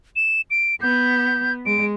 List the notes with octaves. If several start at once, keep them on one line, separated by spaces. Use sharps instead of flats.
E7
D7
B3 G6
G#3 D7